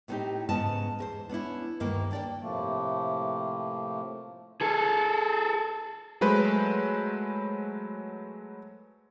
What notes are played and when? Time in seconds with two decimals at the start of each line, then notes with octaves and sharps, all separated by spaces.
0.08 A2 A3 B3 C4 D#4 G4
0.49 G#2 C#3 B3 C#4 D#5 A5
0.99 E2 A#4 C5
1.29 B3 C#4 D4 E4
1.80 D2 G2 D#3 A#3 A#4
2.11 D4 D5 G5
2.40 A2 C3 F3 A3 A#3
4.61 G#4 A4
6.21 F#3 G#3 A3 B4 C5